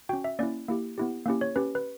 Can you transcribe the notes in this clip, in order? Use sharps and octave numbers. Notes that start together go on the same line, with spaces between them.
C#4 F#4 G5
E5
A#3 C#4 E4 D5
A#3 E4 G4
B3 E4 G4
A#3 C#4 E4 G4
C#5
C#4 G4 B4
B4